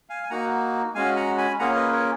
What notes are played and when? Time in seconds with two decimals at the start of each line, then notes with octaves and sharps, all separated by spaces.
0.09 F5 G#5
0.23 G#5
0.30 A#3 D#4 F#4 F#5 A#5
0.95 G#3 C#4 F#4 F5 G#5
1.16 F#5 A#5
1.38 G#5 B5
1.59 A#3 C#4 F4 G#4 F#5 A#5
1.70 C#5
1.76 B4 D#5
1.92 A#4 C#5